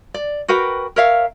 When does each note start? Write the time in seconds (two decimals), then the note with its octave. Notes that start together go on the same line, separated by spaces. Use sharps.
0.14 D5
0.48 F#4 A#4 B4 G5
0.96 A#4 C#5 E5 F5